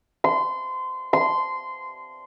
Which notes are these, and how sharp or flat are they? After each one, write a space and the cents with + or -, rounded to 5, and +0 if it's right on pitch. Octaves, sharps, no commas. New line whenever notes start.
C6 -25
C6 -15